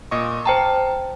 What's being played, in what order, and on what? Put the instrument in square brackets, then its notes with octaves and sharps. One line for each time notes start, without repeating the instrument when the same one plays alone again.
[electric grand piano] A#2 D#5 C#6
[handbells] C5 G5 A#5 [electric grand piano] A5